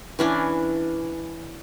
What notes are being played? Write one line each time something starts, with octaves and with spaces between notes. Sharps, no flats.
E3 C#4 D4